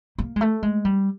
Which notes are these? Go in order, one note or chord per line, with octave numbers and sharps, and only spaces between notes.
A#3
G#3
A3
G#3
G3